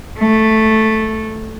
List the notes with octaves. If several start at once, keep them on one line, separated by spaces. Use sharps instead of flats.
A3